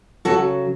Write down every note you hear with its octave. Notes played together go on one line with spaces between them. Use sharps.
C#3 F#3 F#4 A4